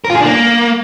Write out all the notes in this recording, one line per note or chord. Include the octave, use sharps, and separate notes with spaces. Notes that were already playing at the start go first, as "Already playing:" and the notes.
A#4
F4
G#4
D4
A#3